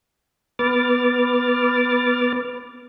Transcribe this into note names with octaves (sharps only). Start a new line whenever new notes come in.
B3 B4 D6 F6 A6